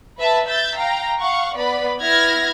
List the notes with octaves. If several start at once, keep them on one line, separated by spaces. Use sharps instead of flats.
B4 E5 A5
E5 G6 A6
F5 G5 A#5
F5 F#5 C#6
B3 B4 D5 B5
B3 E4 E5 F6 G#6 A#6